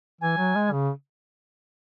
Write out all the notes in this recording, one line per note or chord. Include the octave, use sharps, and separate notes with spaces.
E3 G#5
F#3
G#3
C#3